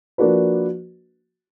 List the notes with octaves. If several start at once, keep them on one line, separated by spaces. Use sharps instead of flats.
F3 A#3 D4 F#4 B4